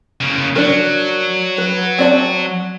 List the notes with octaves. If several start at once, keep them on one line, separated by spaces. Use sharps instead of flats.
C#3 A#3
F#3 D4 A#4
B4
C4 D5 A5